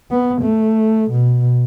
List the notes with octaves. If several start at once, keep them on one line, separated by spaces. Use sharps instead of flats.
B3
A3
B2